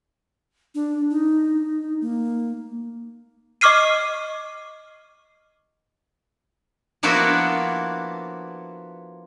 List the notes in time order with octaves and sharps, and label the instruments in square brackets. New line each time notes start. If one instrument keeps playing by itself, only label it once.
[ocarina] D4
D#4
A#3
[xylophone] D#5 C#6 D6 F6 C7 D#7
[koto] F3 A#3 B3 D4 E4 F#4